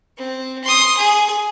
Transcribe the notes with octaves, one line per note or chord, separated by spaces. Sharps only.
C4
C6 D#6
G#4